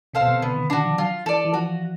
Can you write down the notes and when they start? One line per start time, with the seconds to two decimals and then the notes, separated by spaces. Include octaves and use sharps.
0.14 C3 A4 C5 F5
0.21 B2
0.28 C3
0.42 D3 B3
0.56 D#3
0.70 D#3 D4 F#4
0.84 F3
0.98 F#3 F4
1.26 E3 A4 D5
1.45 E3
1.54 F3 F#4